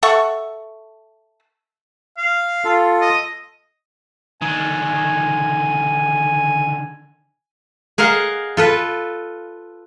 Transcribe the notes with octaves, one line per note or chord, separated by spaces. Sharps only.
A4 E5 F#5 C#6
F5
F4 A4
D#5
D3 D#3 G#5
G#4 A#4 D#5 F5 F#5
F4 A4 B4